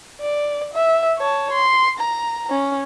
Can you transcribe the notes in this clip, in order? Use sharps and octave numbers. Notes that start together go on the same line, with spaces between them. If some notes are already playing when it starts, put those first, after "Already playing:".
D5
E5
C#5 A5
C6
A#5
C#4